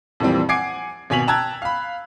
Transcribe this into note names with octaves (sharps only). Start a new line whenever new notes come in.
F2 A#2 E3 G3 C4
F#5 G#5 D6 G#6 C7 D7
G#1 B2 G#5 B6 F7 F#7
G5 A5 A#5 E6 F#6 G#6
F5 B5